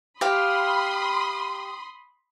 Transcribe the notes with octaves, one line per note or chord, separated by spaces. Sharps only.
G4 F5 B5 C6 D#6